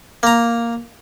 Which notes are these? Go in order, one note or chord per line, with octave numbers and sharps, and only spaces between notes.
A#3 A#5